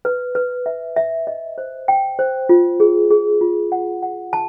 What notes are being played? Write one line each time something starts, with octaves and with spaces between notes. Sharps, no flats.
B4
B4
E5
E5
D#5
C5
G5
C5
F4
G#4
G#4
F4
F#5
F#5
A5